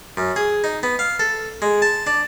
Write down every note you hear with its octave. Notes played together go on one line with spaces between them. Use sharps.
F#2
G#4
D#4
B3
F5
A4
G#3
A5
D4